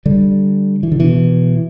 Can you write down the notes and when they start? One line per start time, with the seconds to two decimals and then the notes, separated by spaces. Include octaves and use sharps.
0.06 D3 G3
0.83 E3
0.92 D3
1.00 B2 E3